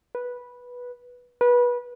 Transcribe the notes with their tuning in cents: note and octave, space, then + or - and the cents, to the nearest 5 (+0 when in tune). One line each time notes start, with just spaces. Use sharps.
B4 -10
B4 -25